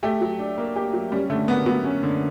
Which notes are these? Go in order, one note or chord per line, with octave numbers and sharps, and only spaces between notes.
A3 G4
F#3
D4
A#3
G4
F#3
G3 C#4
D3 A3
A#3 B3
F#3 B3
C#4
D3